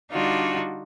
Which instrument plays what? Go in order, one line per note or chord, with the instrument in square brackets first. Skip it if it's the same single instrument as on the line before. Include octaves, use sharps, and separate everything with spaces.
[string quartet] D3 G3 D4 D#4 F4 F#4